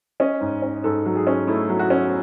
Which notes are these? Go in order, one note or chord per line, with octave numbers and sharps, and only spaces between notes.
C#4 D#5
G#2
C#4
G#2 A4
F#3
G#4
C#4
A3 E4
F#3
F#4
C#4